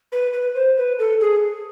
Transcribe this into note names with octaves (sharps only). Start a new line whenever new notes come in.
B4
B4
C5
B4
A4
G#4